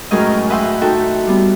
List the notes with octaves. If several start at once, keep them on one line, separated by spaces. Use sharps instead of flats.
F#2 A2 G#3 G#4 A#4 D#5
B4 D#5 E5 F#5 G5 C6
D#4 F#4 A4 E5 G5
G3 B3